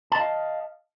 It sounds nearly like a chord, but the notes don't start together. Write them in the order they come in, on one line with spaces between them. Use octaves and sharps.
A5 D#5 F5